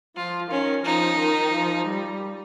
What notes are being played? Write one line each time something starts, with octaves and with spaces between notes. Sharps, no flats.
F3 F4
D#3 C#4
F3 D#4
D#3
F3
G3